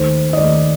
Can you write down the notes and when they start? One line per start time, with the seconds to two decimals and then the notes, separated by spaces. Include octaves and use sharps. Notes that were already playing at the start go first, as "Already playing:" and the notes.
Already playing: D#2 D#3 A3 C5
0.33 D#5
0.37 D#2 D#3 A3 D5